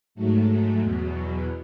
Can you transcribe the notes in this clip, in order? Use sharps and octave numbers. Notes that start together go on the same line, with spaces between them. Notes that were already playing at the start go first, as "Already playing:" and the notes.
G#2 F#3 A3
E2 B2 F#3